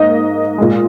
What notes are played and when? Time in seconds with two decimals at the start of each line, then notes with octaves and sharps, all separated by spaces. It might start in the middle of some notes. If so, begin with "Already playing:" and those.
Already playing: G#2 A#3 D#5
0.58 A#2 G#3